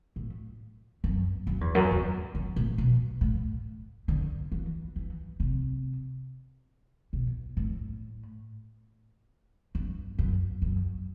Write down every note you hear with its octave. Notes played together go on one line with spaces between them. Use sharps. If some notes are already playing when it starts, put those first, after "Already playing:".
A2
F#2
F#2
E2
F#2
E2
F#2
A2
B2
A2
D3
E3
E3
C3
B2
A2
G2
F#2
F#2